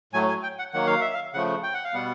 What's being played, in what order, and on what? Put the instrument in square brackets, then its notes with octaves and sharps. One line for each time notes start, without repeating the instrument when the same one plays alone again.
[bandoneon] A2 F#3 A3 G#5
G#5
G5
F#5
D#3 F#3 A#3 F#5
F5
E5
F5
C#3 F3 A3 F#5
G5
F#5
F5
B2 G3 B3 F#5